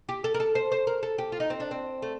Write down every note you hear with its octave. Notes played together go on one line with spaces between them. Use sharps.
G4
A4
A#4
A4
C5
C5
A#4
A4
G4
F4
D#4
C4
D4
C4
A3